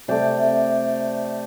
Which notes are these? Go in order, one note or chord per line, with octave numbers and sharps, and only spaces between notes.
C3 A3 D5 G5